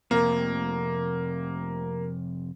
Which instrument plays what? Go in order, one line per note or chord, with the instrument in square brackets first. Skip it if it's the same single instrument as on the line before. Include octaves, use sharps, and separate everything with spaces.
[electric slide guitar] F2 C3 [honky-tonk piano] A#3